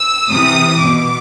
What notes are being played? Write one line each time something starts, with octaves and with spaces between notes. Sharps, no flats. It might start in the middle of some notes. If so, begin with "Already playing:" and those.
Already playing: E6
C3 E3 D#6
B2 D6